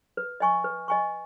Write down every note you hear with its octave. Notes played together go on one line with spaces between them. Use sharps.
B4
D#5 G#5 C#6
B4
D#5 G#5 C#6